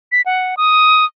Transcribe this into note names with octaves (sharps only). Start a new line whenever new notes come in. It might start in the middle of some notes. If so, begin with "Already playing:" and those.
B6
F#5
D#6